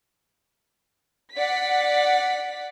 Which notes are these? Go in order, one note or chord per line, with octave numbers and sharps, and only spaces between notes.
D5 F#5 B6